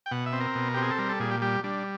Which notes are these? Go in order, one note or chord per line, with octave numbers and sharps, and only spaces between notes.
G5
B2 F#5
E5
C4
A#4
B2
C4 G4
G#4
A4
G3 A#4
A4
A#2 G#4
G4
G3 G4
G3 D4